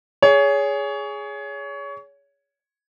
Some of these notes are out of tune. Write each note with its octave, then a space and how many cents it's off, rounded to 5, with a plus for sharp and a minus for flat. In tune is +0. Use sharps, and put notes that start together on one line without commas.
G#4 +0 C#5 +25